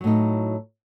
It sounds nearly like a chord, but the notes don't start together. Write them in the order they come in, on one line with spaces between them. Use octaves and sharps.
F#3 A2 D#4